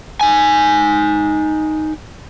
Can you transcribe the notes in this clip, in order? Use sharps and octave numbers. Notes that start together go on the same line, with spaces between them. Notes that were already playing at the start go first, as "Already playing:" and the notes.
D#4 G#5